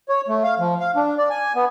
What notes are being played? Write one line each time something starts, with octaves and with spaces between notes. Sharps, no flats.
C#5
A3
F5
F3
F5
D4
D5
G#5
B3